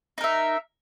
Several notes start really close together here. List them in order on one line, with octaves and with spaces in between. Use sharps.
D#4 A#4 E5